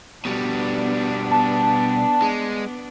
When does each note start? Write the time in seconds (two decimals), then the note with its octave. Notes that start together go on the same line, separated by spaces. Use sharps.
0.25 B2 G3 B3 D4
1.31 A5
2.22 G#3